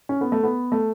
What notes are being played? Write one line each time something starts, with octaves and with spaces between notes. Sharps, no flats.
C#4
B3
A3
B3
A3